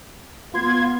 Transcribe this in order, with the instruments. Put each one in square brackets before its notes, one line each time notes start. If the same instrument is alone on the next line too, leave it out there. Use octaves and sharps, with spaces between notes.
[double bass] B3 [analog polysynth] F4 C6 G#6